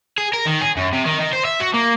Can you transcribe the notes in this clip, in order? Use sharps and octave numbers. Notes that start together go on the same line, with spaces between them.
G#4
A#4
D#3
G#4
F#2
C3
D#3
D#3
C5
E5
F#4
A#3